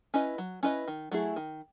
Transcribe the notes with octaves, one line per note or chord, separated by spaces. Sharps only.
C#4 E4 B4 D#5
F#3
C#4 E4 B4 D#5
D#3
F#3 A3 E4 G#4
D#3